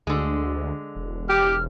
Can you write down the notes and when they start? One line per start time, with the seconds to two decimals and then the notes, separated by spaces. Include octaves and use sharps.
0.07 D2 D3 G#3
0.96 E1
1.29 G4 F6